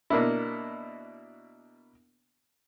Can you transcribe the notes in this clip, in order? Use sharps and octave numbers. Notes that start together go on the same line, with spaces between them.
B2 A#3 D4 E4